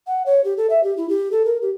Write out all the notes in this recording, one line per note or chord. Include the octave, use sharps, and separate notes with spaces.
F#5
C#5
G4
A4
E5
G4
E4
G4
A4
A#4
G4